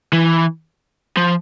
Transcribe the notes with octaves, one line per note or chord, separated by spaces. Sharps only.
E3
F3